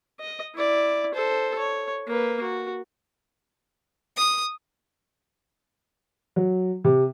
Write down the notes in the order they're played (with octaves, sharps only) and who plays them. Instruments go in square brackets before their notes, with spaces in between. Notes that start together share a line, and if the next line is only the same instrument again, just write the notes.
[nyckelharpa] D#5
E4 D5
A4 C5
C#5
A#3 B4
F#4
[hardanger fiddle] D#6
[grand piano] F#3
C3